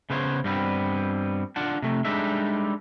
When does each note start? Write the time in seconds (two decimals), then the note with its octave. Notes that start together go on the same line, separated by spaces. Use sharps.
0.10 C#3 B3 C5 C#5
0.44 G2 G3 B3 C4
1.56 D4 F4 F#5 A5
1.82 C3 A3
2.05 G3 G#3 D4 D#4 A4 E5